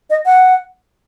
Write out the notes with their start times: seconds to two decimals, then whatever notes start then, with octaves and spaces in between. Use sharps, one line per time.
0.10 D#5
0.26 F#5